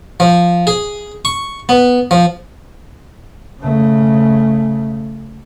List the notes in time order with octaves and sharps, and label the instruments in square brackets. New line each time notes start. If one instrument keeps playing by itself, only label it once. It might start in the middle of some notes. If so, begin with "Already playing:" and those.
[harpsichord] F3
G#4
C#6
B3
F3
[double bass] C#3 A3